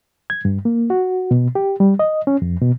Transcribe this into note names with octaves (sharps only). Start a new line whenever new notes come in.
G#6
G2
A#3
F#4
B2
G4
G3
D#5
C#4
F2
B2